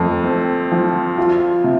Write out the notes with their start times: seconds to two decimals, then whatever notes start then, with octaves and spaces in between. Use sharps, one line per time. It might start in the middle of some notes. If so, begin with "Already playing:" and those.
Already playing: F2 A3
0.24 C4
0.72 F3
1.18 F4
1.64 C3